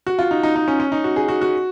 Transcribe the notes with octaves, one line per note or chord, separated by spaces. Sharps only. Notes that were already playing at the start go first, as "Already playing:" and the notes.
F#4
F4
D#4
D#4
D#4
C#4
C#4
D#4
F#4
G#4
F#4
F#4